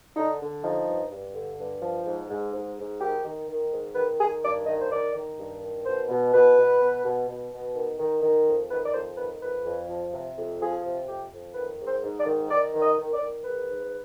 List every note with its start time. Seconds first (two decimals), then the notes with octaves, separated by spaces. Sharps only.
0.16 D3 D#4
0.39 D3
0.63 F3 D#4
0.87 G2
1.11 G2
1.34 D3
1.58 G2
1.82 F3
2.06 G#2
2.29 G#2
2.53 G#2
2.76 G#2
3.00 D#3 G4
3.24 D#3
3.48 D#3
3.71 G#2
3.95 D#3 B4
4.19 D#3 G#4
4.43 G2 D5
4.66 D#3 D#5
4.80 C5
4.90 D#3 D5
5.14 D#3
5.38 G2
5.61 D#3
5.85 B2 C5
6.09 B2
6.32 B2 B4
6.57 B2
6.81 B2
7.04 B2
7.27 B2
7.51 B2
7.75 D#3
7.99 D#3
8.22 D#3
8.46 F2
8.69 D#3 B4
8.86 D5
8.93 F2 C5
9.17 D#3 B4
9.41 F2 B4
9.64 F2
9.88 F3
10.13 C3
10.36 F2
10.60 F3 G#4
10.83 C3
11.07 F2 G4
11.31 F2
11.54 D#3 B4
11.78 G#2
11.87 C5
12.02 G#2
12.18 D5
12.26 D#3
12.50 D#3 D5
12.73 D#3
12.81 D#5
12.97 D#3
13.13 D5
13.20 D#3
13.44 G#2 B4
13.68 G#2